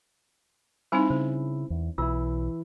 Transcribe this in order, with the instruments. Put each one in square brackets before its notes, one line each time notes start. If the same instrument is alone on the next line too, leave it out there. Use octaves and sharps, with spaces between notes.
[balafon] G3 C4 D#4 [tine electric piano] E4 [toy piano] C5 G#5 B5
[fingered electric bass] C#3 [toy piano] C5
[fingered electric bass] E2
[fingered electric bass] B1 [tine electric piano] E3 E4 [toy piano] F4 E6